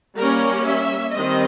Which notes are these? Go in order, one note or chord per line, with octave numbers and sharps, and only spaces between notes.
G3 A#3 C#4 A#4
E5
D#3 G3 C4 D#5